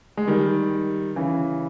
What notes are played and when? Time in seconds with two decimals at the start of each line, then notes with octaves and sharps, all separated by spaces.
0.17 G#3
0.27 D#3 G3
1.16 C#3 E3